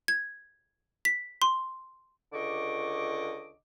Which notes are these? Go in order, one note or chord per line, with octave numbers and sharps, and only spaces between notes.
G#6
B6
C6
C#2 D3 D#5 C#6 D6